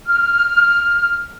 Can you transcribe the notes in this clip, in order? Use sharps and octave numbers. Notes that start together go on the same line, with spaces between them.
F6